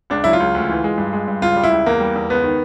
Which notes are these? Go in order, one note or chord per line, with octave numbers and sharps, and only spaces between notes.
C#2 D4
F#3 E4
F4
C#2
D2
E3
G#3
G2
G#3
G2
C#2 F4
G3
E4
C#2
E2 A#3
G3
E2
C#2 B3
D#3